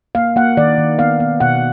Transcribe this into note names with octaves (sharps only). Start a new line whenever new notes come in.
A#3 F5
A#3 F#5
D#3 D5
D#3
B3 F5
B3
B2 F#5